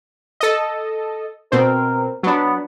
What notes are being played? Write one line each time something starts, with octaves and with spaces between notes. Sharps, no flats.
A4 D#5
B2 C4 A#4
F#3 B3 D4